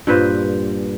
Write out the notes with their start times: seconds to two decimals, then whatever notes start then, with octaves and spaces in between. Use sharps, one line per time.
0.07 G2 A#2 B4 C5